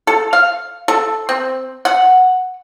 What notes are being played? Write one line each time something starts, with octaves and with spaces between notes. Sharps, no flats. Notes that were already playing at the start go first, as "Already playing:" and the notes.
A4
F5
A4
C4
F#5